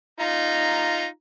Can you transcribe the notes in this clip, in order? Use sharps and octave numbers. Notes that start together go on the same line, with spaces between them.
D#4 F4 A#5